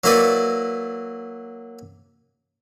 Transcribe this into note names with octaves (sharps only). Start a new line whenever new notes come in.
F#3 A#3 E4 A#4 B4 D5